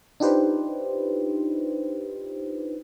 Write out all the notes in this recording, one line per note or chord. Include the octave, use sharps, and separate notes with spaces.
D4 D#4 F4 G4 B4 C5